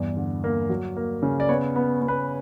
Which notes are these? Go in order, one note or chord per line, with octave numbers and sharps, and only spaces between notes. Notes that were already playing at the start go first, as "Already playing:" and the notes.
Already playing: E2 G2 D5
D3
A#3
F#3
A#3
C#3
D5
B3 C#5
B3
B3
B4